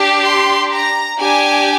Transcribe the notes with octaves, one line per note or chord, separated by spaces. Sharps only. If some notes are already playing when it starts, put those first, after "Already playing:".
Already playing: D4 G4
C6
A#5
D4 G4 G#5